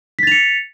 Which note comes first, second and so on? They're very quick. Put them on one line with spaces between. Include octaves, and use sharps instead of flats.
B6 A6 F7 C#7